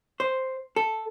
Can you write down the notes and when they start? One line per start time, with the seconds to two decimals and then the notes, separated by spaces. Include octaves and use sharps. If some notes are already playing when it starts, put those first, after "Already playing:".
0.20 C5
0.76 A4